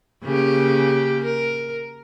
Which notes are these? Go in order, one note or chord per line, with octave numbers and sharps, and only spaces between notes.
C#3 A#3 G4
A#4